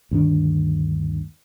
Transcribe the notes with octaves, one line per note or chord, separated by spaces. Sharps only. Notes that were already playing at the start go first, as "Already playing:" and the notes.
D2 G2 D#3 D4